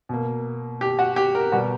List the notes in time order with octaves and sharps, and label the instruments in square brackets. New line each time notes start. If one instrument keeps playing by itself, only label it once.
[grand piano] B2 A#3
G4
F#4
G4
A#4
B2 G3 B3 F#4